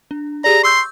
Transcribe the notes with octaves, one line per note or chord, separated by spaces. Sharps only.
D4
G4 G#4 D5 A#5
C6 C#6 E6 G6